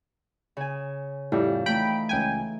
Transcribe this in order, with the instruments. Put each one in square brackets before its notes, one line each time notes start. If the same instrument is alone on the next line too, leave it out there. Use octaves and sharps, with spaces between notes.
[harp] C#3 G#5
[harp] F2 [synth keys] A2 G3
[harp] E3 A3 D#4 [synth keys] G5 B5 D7
[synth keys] C#2 G5 G#5